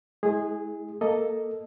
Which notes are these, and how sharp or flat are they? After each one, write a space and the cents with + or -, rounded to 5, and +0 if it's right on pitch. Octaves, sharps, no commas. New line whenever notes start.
G#3 +30 E4 -30 G#4 -15
A#3 +0 A4 +0 D#5 +0